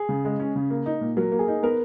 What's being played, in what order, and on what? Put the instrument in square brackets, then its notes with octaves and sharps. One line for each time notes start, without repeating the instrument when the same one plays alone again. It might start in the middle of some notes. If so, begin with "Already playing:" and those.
Already playing: [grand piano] G#4
[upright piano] C#3
G#3
C#4
C#3
A#3
D#4
A#2
[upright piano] F#3 [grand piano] A#4
[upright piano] A#3
[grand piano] G#4
[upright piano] D#4
[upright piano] B3 [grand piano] A#4